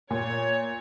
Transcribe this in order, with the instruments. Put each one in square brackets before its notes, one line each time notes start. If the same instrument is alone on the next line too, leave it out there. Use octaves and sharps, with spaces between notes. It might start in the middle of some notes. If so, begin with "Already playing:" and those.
[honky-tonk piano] A#2 [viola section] C#5